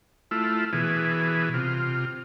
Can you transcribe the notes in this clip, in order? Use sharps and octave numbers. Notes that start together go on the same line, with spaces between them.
A3 E4 F4
B2 E3 G#4
C3 F4